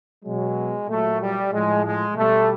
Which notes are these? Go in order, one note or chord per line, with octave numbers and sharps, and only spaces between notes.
B2 F#3 G#3
A#2 F#3 A3
G3
A2 F3 G#3
G#3
B2 G3 A3